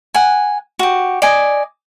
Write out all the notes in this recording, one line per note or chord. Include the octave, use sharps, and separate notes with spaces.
F#5 G#5
F#4 G4
D5 D#5 G#5